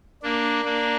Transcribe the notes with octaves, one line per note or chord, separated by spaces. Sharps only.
A#3 D4
A#3 D4